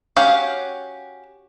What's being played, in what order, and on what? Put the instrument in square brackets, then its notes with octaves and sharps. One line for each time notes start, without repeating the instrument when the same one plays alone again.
[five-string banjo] C#4 F#4 G4 F5